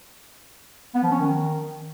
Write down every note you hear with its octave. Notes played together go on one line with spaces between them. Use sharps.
B3
F3
C#4
D#3